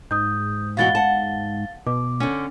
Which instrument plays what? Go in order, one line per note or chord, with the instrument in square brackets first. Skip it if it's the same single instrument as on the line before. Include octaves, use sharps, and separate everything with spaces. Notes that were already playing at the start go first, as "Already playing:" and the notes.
[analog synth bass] G#2 [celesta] D#6 G6
[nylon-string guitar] B2 E3 F#4 [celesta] F5 A6 G7
[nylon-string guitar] F#5 A5
[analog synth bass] B2 [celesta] D6
[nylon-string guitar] D3 C#4